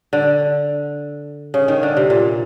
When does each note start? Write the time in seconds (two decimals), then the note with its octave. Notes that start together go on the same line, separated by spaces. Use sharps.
0.13 D3
1.54 C#3
1.68 D#3
1.83 D3
1.97 C3
2.10 A#2